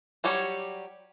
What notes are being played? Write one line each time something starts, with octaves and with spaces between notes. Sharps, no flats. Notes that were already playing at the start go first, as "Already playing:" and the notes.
F#3 G3 G4 C#5